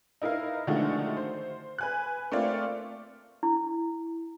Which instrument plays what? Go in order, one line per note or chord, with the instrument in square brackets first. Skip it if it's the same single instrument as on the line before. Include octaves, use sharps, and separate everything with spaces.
[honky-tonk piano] D#4 E4 A#4 B4 F5
D3 D#3 F3 G#3 A3 F#4
C5
B4 G#5 F#6
A3 A#3 C4 F4 D5
[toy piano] E4